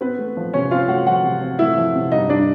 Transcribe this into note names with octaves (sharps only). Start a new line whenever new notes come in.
B3 C4 B4
A3
F3
C3 C#4 C#5
C4 F4 F5
A3 F#4 F#5
F3 F#4 F#5
C3
C4
A3 E4 E5
F3
C3
G2 D#4 D#5
G3 D4 D5